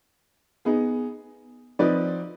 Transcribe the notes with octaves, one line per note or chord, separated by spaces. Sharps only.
B3 D#4 G#4
F3 C4 D#4 B4 D5